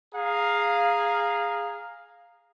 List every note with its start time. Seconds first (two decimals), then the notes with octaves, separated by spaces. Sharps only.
0.13 G#4 F5 A#5